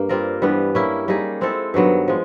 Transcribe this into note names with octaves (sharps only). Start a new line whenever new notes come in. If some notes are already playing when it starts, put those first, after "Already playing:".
Already playing: G2 A#3
G3 C4 F4 A#4
G2 E3 G3 B3
G3 A#3 C#4 E4
G3 A#3 D#4 G#4
G#3 C4 E4 A4
G2 D#3 F#3 B3
F3 G#3